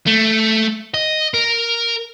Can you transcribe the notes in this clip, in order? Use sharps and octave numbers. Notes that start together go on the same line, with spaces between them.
A3
D#5
A#4